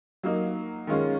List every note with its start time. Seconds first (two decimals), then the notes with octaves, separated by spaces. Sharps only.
0.23 F#3 A#3 D#4
0.87 D#3 G#3 C#4 F4